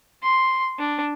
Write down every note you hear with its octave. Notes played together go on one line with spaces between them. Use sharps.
C6
D4